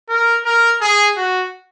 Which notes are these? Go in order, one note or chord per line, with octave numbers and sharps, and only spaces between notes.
A#4
A#4
G#4
F#4